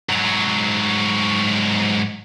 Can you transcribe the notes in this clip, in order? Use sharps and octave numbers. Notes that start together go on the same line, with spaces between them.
G#2 F#3